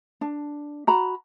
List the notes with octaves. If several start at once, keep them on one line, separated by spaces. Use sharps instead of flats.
D4
F#4 A#5 B5